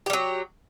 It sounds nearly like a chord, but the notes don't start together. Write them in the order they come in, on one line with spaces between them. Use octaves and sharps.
G4 G3 F#3